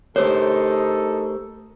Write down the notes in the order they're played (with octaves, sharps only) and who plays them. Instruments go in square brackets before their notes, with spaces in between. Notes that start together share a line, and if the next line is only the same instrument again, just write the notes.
[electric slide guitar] A3 G4 A#4 [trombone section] D#4 A4 [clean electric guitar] C5 [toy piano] C#5